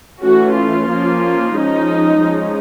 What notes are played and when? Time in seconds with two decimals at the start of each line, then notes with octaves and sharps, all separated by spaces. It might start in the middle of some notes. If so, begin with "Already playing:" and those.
0.23 E3 A3 C#4 F#4
0.56 F4
0.89 F3 A#3 C#4
1.53 F3 G#3 C#4 D#4
2.20 F3 G#3 C#4